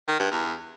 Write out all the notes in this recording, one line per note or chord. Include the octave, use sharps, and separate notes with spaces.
D#3
G2
E2